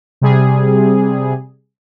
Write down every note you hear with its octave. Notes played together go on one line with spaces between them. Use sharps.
C3 G3 G#4